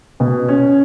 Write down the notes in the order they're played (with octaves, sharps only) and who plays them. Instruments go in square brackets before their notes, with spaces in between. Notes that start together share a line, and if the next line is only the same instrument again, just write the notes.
[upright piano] B2
C#4